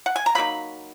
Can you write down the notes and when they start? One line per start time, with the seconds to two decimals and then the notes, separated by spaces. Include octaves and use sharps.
0.06 F#5
0.16 G#5
0.26 A#5
0.35 C#3 F#3 A#3 D#4 B5